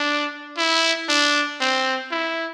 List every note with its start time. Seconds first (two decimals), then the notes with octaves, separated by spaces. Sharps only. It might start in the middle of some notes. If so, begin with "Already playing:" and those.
Already playing: D4
0.57 E4
1.09 D4
1.60 C4
2.11 E4